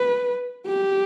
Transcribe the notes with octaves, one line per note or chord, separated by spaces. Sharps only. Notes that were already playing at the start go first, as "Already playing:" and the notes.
Already playing: B4
G4